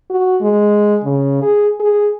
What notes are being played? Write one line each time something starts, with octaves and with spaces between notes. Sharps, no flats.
F#4
G#3
C#3
G#4
G#4